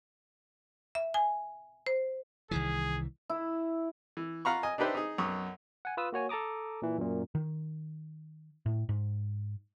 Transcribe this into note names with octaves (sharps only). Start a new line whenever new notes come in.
E5
G#5
C5
C2 D#3 E3 G#4
E4
E3
F4 F5 F#5 A#5 B5 C#6
D#5 G#5
D4 D#4 G4 B4 C5 E5
D#4 G#4
B1 F#2 C#6 D#6
F#5 G#5
F4 B4 D#6 E6
A#3 F#4 C#5 G#5
A4 A5 A#5 D6 D#6
A#2 E3
F#2 A#2
D#3
A2
G#2